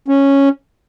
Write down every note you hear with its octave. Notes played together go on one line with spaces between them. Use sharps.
C#4